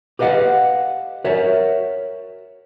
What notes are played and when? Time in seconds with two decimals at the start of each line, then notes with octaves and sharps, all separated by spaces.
0.19 G4 B4 D#5 F5 F#5
1.24 F#4 A#4 C#5 E5